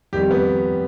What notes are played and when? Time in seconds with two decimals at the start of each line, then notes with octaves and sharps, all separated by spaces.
0.13 F2 D#3 G3 G4
0.31 B3